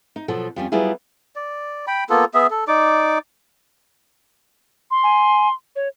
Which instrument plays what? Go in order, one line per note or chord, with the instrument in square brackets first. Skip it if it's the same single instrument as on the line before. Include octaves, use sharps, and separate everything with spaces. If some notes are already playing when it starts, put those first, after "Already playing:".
[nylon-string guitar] D#4
B2 F3 F#3 A4
F2 G3 C#4
F#3 G3 B3 E4 F4 G#4
[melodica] D5
G5 B5
A#3 B3 F4 A4
B3 G#4 E5
A4
D#4 D5 D6
[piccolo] C6
[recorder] G#5
C#5